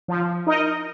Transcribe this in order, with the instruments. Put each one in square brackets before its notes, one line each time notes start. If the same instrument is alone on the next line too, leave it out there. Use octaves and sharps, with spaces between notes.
[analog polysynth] F3
D#4 A#4 D#5